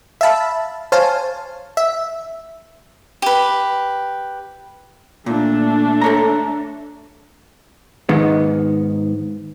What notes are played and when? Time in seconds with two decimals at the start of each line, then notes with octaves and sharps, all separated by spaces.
0.21 E5 F5 A5 B5
0.92 C5 C#5 F5 G#5 A5
1.77 E5
3.22 G4 B4
5.26 A#2 A3 D4
6.01 A4 C#5 A#5
8.09 G#2 D#3 B3